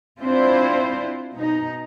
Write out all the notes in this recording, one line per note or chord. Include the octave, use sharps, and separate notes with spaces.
C4 D4 E4 F4 C5
B2 D#4